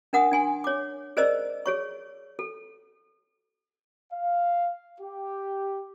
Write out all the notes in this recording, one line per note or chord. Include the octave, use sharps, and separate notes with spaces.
D4 A#4 F#5 D#6
D4 G#5 C6
C#5 D6
G#4 A#4 C5 D5 D#5 E6
G#4 C#5 C#6
A4
F5
G4